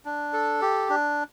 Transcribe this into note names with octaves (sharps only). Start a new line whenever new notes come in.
D4
A4
G4
D4